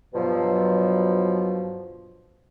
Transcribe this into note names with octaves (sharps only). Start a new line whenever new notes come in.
G2 B2 F3 F#3